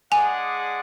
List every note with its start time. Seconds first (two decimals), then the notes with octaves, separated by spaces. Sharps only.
0.11 G#3 D4 G#4 D5 F#5 G#5